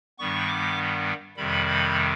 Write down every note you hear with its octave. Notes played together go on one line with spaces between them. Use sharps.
G2 D#3 G3 B3 C#6
D6
F2 C3 D#3 G3 B5
B5